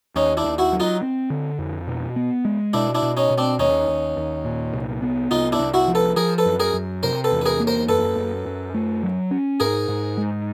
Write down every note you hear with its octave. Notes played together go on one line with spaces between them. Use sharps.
D#2 C#4 D#4
D4 E4
D#2
E4 F#4
F#3
D#4 F4
C4
D3
F2
B2
B3
G#3
B2 D4 E4
D4 E4
B2
C#4 D#4
B2
C4 D4
D#2 C#4 D#4
D#2
D#2
A#2
C2
B3
C2 D#4 F4
D4 E4
C2
E4 F#4
F3
A4 B4
F3 G#4 A#4
A4 B4
F#2
G#4 A#4
F#2
C3 A#4 C5
A4 B4
E2
B4
G#4 A#4
A#3
A#4 C5
F#2 A4 B4
F#2
F#2
A3
F#3
C#4
G#2 G#4 A#4
G#2
G#3